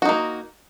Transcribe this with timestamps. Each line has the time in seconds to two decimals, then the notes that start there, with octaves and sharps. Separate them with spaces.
0.02 F#4
0.05 D#4
0.09 A#3